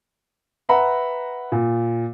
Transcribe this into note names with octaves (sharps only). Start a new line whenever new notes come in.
B4 E5 F#5 A#5 B5
A#2